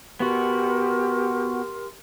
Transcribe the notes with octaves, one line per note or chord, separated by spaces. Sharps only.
B3 F#4 G4 A#4 C6